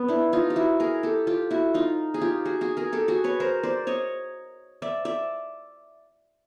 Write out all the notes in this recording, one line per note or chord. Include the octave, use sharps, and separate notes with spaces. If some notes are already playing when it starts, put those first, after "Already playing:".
Already playing: B3
D4 E4
D#4 F4
G4
E4 F#4
G#4 A#4
G4 A4
F4 G4
E4 F#4
D#4 F4
G#4
F4 G4
F#4 G#4
F#4 G#4
G#4 A#4
G4 A4
F#4 G#4
B4 C#5
A#4 C5
C5 D5
C#5 D#5
D5 E5
D5 E5